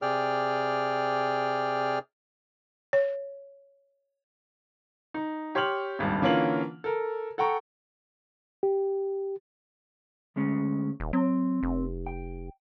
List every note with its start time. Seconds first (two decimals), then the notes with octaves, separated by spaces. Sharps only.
0.02 C3 G#4 D5 G5 F6
2.93 C#5
5.14 D#4
5.55 G4 C#5 C6 F6 F7 F#7
5.99 D#1 G#1 C#2 G2
6.22 D3 E3 A#3 C#4 F4 F#7
6.84 A4 A#4
7.38 A4 F#5 G5 A#5 C#6
8.63 G4
10.36 D2 G#3 C#4
11.00 D#1
11.13 F#3 C4
11.63 F1
12.07 G5